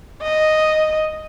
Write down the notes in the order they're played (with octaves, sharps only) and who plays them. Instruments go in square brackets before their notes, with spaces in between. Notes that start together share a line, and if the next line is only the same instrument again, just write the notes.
[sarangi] D#5